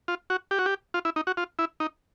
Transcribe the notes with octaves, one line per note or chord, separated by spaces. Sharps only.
F4
F#4
G4
F#4
G4
F4
E4
D#4
F#4
F4
E4
D#4